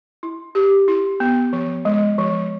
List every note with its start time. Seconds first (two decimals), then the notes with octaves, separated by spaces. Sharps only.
0.23 E4
0.55 G4
0.88 E4
1.20 B3
1.53 F3
1.85 G#3
2.18 F3